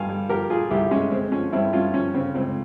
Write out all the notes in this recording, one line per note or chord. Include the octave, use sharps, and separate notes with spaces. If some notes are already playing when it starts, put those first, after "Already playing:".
Already playing: G2 F5 G#5
G3
F3 G4 A#4
A#2 F4 G#4
C2 E4 G4
G#3 C#4
G#3 C4
F3 C#4
G2 C4 E4
G2 C#4 F4
F3 C#4
C#3 C4
C#2 C4